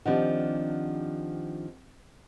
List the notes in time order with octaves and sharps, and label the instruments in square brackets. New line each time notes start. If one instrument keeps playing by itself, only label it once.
[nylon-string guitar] D#3 F3 D4 [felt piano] C4 G4 F#5